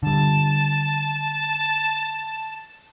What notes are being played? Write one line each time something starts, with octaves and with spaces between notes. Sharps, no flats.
D3 G3 A5